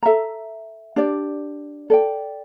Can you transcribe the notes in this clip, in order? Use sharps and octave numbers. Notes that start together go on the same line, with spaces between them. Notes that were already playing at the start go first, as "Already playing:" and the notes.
A4 E5 A#5
D4 G4 D5
A4 D5 G5